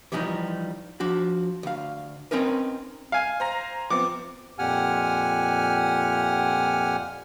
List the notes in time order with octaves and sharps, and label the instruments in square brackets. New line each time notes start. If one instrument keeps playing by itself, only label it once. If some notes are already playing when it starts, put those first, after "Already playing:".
[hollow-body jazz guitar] E3 F3 G3 D4 D#4
F3 D4 F#4
D2 F5
C4 C#4 D#4 A#4 B4
[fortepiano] F5 G#5
[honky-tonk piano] C5 A#5 A#6
[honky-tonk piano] F3 B3 C4 [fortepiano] D6
[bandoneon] F2 A#2 G4 F#5 G#5 F6